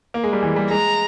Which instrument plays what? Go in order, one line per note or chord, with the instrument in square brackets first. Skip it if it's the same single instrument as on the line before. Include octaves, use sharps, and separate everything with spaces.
[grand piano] A#3
G#3
G3
E3
G3
[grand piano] G#3 [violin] A#5